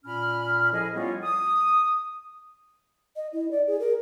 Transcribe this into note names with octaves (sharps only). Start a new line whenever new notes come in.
A#2 C#4 B5 F6
F3 E4 G#4 A4 D#5
G3 B3 C#4 E4 F4
D#6
D#5
E4
D5
G#4
A#4